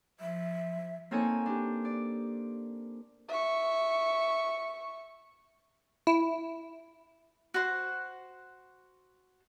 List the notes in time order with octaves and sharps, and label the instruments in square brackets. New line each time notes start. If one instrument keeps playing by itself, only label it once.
[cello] F3 [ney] E5
[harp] A#3 C4 D#4 A4 C#5 G#5
D4 G4
D5
[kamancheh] E5 C#6
[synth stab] E4
[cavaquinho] F#4 C5